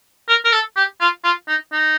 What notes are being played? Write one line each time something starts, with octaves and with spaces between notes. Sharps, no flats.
A#4
A#4
A4
G4
F4
F4
D#4
D#4